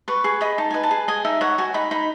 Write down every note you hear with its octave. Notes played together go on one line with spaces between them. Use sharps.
B4 C#6
G#4 C#6
D#5 B5
D#4 A5
B4 G#5
A5
G#4
D#5 G#5
D#4 E5
C#5 F#5
F#4 G#5
D#4 B5
D#4 B5